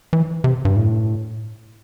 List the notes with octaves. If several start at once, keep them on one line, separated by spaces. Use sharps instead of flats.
E3
C3
G2
A2